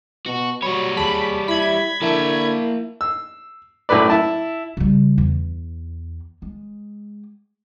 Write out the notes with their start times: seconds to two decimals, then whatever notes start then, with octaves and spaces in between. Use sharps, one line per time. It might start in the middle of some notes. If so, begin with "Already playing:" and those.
0.26 B2 F#4
0.63 F#3 G3 C#5 B5
0.97 D#2 G#4 A5 B5
1.48 E4 B5 G#6
2.02 D3 A#3 E4 A#4 E5 A5
3.01 E6
3.89 F#2 A2 A3 B4 D5
4.10 E4 A5
4.77 C#3 G3
5.18 E2
6.42 G#3